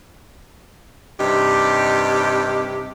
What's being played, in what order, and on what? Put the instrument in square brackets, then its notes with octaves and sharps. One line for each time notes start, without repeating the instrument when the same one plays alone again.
[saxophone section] G2 C3 D#4 G4